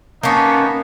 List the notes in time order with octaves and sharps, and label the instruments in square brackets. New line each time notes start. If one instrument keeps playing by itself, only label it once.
[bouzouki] A#3 C#4 [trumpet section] B3 D#4 A5